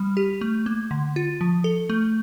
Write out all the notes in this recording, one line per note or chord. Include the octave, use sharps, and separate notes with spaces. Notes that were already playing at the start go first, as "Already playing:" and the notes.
Already playing: G3
G4
A3
A#3
D3
F4
F3
A4
A3